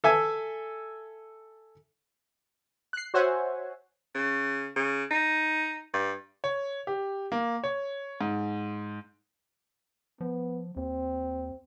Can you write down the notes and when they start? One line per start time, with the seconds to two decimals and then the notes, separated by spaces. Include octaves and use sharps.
0.04 A4 E5 G#5
2.93 F#6 C7
3.14 F#4 C5 C#5 E5 F#5 G#5
4.15 C#3
4.76 C#3
5.11 D#4
5.93 G2
6.44 C#5
6.87 G4
7.32 A#3
7.64 C#5
8.21 G#2
10.21 F3 B3
10.76 D#2 C4